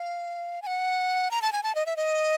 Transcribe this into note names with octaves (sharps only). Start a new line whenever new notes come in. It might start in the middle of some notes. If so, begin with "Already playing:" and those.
Already playing: F5
G#5
F#5
A#5
A5
G#5
A5
D#5
E5
D#5